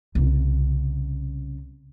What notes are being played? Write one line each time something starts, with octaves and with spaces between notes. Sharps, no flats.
C2 C#3